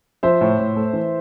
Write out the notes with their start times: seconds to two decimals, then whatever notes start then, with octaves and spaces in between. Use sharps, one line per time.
0.23 F3 C5 E5
0.41 A2
0.59 A2
0.76 A3
0.93 E3